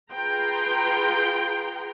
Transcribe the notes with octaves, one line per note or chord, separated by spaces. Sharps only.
F4 G#4 B4 G5 A#5 C6